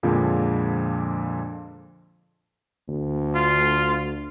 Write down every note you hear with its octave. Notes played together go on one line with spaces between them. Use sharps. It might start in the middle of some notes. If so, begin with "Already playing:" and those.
F2 A#2 D3 F3 G#3
D2
F4